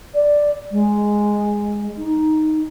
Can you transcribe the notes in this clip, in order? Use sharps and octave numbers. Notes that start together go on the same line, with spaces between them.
D5
G#3
D#4